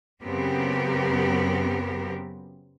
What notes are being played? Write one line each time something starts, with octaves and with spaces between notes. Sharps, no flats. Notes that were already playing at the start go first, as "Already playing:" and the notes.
F#2 C#3 B3 C4 G4 A#4